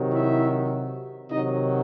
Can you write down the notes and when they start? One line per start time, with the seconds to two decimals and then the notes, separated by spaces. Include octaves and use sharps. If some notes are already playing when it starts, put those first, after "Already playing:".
Already playing: C3 D#3 F#3
0.12 E4 E5
1.30 C3 D#3 F#3 D#4 D#5